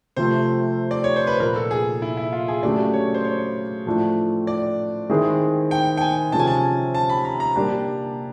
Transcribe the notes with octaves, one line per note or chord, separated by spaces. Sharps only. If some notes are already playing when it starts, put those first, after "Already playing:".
C3 F3 A3 C5
D5
C#5
C5
B4
A#2 F3 A#3 A#4
A4
G#4
E4
E4
F4
G#4
C#3 F#3 A3 D4 G4 D5
C#5
C5
C#5
A2 F3 A3 D4
D5
D#3 G#3 C4 E4 G#4
G5
G5
G#5
C3 F3 G#3 C#4 A5
G#5
A5
A5
B5
A#5
A#5
G3 A#3 D4 G4